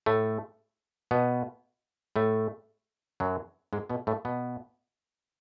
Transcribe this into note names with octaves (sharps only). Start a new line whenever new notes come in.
A2 A3
B2 B3
A2 A3
F#2 F#3
G#2 G#3
B2 B3
A2 A3
B2 B3